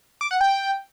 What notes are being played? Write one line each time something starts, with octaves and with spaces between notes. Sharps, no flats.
D6
F#5
G5